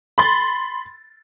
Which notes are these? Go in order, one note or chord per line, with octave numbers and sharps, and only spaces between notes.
B5 C6 A6